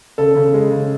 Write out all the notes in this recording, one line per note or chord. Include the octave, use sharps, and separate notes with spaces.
C#3 A4
C#3
G#3
C#3